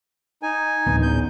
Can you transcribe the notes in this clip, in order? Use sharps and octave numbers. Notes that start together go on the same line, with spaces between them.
D#4 G#5
A1 D2 B3
E2 G6